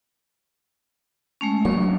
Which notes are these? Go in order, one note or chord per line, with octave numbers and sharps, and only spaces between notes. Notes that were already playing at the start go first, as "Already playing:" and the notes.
G#3 A3 C#4
F#3 A#3 D4 C#6